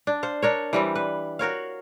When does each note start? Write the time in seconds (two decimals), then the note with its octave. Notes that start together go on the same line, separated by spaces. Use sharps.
0.07 D4
0.23 C5 F5
0.42 D4 A#4 C#5
0.73 E3 G3 C4
0.95 B4
1.39 F#4 A#4 C#5 F5